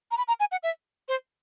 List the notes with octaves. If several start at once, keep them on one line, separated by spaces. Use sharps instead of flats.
A#5
B5
A#5
G#5
F#5
E5
C5